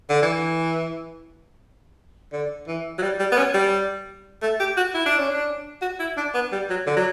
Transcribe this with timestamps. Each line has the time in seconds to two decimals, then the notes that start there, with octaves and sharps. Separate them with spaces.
0.10 D3
0.23 E3
2.33 D3
2.68 E3
2.99 F#3
3.03 G3
3.20 G3
3.32 B3
3.38 C#4
3.55 G3
4.42 A3
4.60 G4
4.77 F#4
4.95 E4
5.06 D4
5.19 C#4
5.29 D4
5.82 F#4
6.00 E4
6.17 D4
6.34 B3
6.52 G3
6.70 F#3
6.87 D3
6.97 F#3